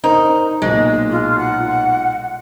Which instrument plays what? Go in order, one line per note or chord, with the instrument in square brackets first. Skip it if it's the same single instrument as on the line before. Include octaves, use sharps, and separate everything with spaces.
[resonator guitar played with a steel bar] D#4 [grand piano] A#4 C5 A#5
[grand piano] B1 A#2 [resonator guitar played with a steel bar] G#3
[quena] F4
F#5